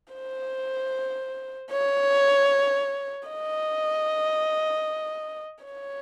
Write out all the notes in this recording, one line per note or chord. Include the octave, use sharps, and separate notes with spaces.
C5
C#5
D#5
C#5